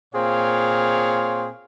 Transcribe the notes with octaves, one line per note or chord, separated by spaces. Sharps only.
A#2 C4 G#4 C#5 F5